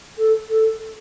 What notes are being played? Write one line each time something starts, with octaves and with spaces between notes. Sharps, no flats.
A4
A4